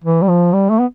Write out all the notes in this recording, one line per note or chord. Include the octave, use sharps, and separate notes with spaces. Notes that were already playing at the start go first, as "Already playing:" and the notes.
E3
G3
F3
G3
A3
B3